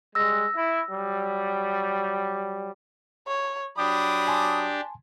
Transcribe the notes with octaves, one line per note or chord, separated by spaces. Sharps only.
G3 G#3 E6 A#6
E4
F#3 G3
C#5
F#3 D4 G4 B5 D6 D#6
G#5 A5 C6